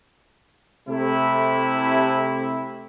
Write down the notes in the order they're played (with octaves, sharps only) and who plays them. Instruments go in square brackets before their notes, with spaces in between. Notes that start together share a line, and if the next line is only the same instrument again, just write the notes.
[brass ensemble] C3 A3 E4